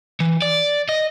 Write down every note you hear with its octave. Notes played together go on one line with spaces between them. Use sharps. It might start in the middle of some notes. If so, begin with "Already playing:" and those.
E3
D5
D#5